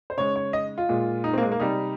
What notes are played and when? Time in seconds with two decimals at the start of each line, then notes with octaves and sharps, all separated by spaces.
0.10 C5
0.17 C#3 G#3 C#5
0.36 C#5
0.53 D#5
0.78 F4
0.89 A#2 G#3
1.24 D#4
1.34 C4
1.38 A#3
1.42 G#3
1.52 A#3
1.60 C3 G3 D#4